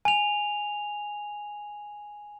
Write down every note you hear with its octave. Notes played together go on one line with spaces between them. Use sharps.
G#5 F7